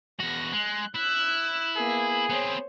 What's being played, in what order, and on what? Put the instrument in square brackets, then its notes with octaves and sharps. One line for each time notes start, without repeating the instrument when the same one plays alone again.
[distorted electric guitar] E2 F#4 [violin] A#6
[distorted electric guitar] G#3 [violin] F#6
[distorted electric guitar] E4 [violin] E6 F#6
[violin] A#3 B3 [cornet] G#4
[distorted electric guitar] B3 C4 [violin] C5 C#5